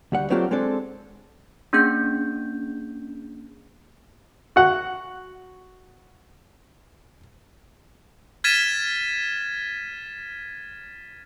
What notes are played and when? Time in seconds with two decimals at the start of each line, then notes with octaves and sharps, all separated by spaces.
0.12 D2 G3 F#5
0.30 F#3 A3 C4 D4 F4 G4
0.51 G#3 C4 D4 A4
1.73 A#3 C#4 D4 G#4 G6
4.56 F#4 F#5
8.44 F6 G#6 A6 B6 D#7 E7